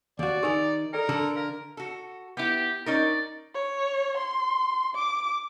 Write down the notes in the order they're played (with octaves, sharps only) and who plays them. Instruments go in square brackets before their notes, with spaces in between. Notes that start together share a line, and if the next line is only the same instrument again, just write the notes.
[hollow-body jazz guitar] D#2 F#4 [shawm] D5
[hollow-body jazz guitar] D#3 D#4 [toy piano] G4 A#4 G#5
[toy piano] A4 D5 G5 [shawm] A#4
[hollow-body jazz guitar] D3 A4 [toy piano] E6
[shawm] A#4 [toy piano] F5
[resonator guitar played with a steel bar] F#4 A4
[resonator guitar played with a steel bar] B3 E4 [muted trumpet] G4
[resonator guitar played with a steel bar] C#4 D#4 A#4 [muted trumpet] D5
[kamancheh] C#5
C6
D6